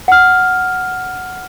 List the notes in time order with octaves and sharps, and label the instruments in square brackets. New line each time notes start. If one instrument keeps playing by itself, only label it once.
[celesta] F#5 F6